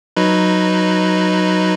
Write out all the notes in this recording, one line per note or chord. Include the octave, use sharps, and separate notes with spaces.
F#3 D#4 B4